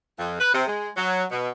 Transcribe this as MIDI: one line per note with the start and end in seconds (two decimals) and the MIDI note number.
0.19 0.39 41
0.40 0.50 71
0.54 0.64 48
0.67 0.89 56
0.97 1.24 54
1.31 1.50 47